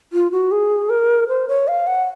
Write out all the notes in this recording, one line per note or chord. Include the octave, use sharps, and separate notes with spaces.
F4
F#4
G#4
A#4
C5
C#5
F5
F#5